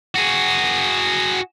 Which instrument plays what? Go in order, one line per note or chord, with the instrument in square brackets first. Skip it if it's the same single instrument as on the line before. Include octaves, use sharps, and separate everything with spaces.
[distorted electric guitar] F#4 G#4